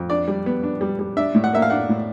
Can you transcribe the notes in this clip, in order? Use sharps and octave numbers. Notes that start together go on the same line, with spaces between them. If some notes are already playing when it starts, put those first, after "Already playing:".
Already playing: F2
D4 D5
G3
B3
D4
G3
G3
D4 E5
A2
F#5
A#3 E5
F5
D4 F#5
A2